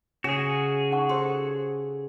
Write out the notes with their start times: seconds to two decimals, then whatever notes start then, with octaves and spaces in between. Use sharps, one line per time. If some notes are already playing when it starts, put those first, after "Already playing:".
0.24 C#3 C#4 F#4 G#4
0.91 D#4 F#5 C#6
1.09 G4 A4 C5 C6